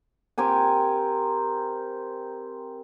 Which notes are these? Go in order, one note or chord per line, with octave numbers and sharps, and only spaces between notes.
C4 G4 A#4 G#5